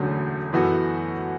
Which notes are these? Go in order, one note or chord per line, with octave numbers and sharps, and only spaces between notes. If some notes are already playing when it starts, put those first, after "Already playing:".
Already playing: E1 D2 D3 F#3 C#4
F#2 E3 B3 F#4 A4